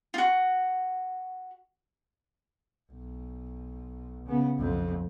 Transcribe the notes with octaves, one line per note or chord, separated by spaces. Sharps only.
F4 F#4
B1
C#3 B3
B1 F2